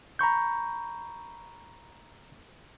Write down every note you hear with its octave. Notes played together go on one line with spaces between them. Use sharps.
A#5 B5 C#6 G6